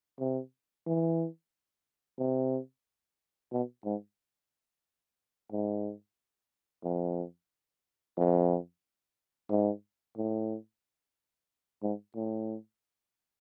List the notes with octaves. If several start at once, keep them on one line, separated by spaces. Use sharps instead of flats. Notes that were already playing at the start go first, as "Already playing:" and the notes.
C3
E3
C3
B2
G#2
G#2
F2
F2
G#2
A2
G#2
A2